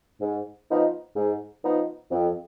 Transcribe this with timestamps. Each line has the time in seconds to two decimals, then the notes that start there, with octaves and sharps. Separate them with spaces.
0.21 G#2
0.69 F3 B3 D#4
1.16 G#2
1.63 F3 B3 D#4
2.11 F2